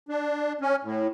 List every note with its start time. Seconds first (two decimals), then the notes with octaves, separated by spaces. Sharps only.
0.09 D4
0.61 C#4
0.83 A2